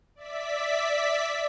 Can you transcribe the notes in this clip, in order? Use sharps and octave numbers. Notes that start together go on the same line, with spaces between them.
D5 E5 B6